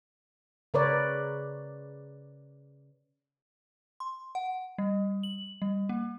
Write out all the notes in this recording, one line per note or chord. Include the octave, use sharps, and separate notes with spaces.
C#3 A#4 B4 C#5 D5
C6
F#5
G3
F#7
G3
A#3